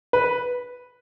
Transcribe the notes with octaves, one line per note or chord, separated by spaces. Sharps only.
B4